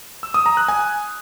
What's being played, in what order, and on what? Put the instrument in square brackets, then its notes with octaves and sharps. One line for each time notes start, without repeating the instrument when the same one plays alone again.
[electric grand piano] E6
D#6
A#5
F#6
G#5